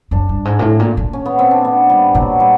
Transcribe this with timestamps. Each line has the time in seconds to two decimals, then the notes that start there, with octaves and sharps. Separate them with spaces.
0.11 F#2 D4
0.29 G2
0.45 G#2
0.59 A#2
0.62 A2
0.79 A#2
0.97 A#2
1.13 C#4
1.26 B3
1.39 C4
1.51 D4
1.65 B3
1.90 G3
2.14 A#2 F#3
2.40 G3